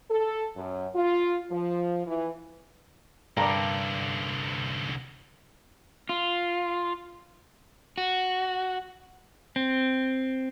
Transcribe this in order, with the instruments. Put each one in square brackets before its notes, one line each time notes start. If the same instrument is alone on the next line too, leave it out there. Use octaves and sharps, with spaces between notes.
[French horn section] A4
F#2
F4
F3
E3
[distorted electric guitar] C2 D3 [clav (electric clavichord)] G2 [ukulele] A#4 D5
[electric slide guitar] F4
F#4
C4